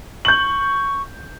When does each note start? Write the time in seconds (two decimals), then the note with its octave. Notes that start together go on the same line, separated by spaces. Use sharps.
0.25 C#6 G6 F#7